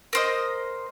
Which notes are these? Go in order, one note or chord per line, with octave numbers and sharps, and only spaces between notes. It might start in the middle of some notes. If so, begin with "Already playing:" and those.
A#4 C5 D#5